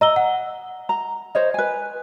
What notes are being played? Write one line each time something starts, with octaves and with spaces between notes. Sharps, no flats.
D#5 A#5 E6 G7
F#5
A#5
C5 C#5 D#5
B4 G#5